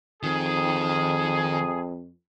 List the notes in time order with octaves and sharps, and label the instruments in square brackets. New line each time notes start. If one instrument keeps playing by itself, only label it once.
[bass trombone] F2 [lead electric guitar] D#3 [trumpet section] G#4